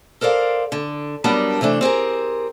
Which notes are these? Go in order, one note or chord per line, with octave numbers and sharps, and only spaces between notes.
A4 A#4 C5 D5 F5
D3
F#3 G3 B3 D4 A#4 A5
C3 E3 A3 D4
C4 G4 G#4 A#4